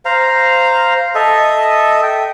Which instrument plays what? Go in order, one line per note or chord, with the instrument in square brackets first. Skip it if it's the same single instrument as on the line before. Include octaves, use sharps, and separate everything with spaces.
[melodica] C5 F5 A#5
A4 D#5 E5
G5